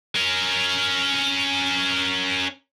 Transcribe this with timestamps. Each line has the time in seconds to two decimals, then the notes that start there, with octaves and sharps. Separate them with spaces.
0.16 C#4 A#4